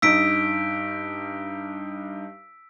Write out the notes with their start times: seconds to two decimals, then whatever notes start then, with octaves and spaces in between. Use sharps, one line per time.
0.02 G2 D#4 E6 B6 D7